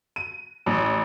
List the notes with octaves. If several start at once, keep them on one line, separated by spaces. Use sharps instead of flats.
D#7
A1